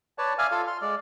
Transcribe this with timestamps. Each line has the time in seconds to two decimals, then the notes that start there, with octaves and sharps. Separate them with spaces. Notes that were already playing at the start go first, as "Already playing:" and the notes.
0.18 B4 C#5 D5 A5
0.38 D5 E5 F5 G#5 F6
0.51 F4 A4 F5
0.67 C6 F6
0.81 G#3 D5